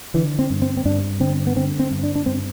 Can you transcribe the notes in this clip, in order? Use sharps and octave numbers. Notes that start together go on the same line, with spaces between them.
D3 E3
C4
G2
C4
C4
G2 D4
D3 C4
B3
D3 C4
C4
G2
D4
D4
G2 C4